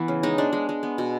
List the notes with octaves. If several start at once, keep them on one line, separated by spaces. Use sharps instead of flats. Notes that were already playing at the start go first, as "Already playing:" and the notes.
Already playing: E3 B3
C#3
G#3 D#4
G#3 D4
G#3
G#3
B3
B2